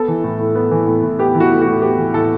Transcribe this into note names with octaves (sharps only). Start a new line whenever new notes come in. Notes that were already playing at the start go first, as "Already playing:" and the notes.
Already playing: B3 A4
E3
A2
A2
B3
E3
A2
A2
B3 G4
E3
F#4
A2
A2 F#4
B3 G4
E3
A2 A4